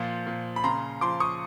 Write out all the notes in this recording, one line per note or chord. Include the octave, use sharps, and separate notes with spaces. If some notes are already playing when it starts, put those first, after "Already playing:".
Already playing: A#2 F3
A#2
B5
C#3 A#5 C6
F3 C6 D6
C#6 D#6